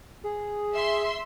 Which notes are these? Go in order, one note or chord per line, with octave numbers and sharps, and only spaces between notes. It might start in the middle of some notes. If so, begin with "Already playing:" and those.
G#4
E5 C6